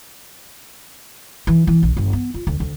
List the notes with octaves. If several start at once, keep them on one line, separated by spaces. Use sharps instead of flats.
E3
E3
A#1
G1
B3
F4
D2
D2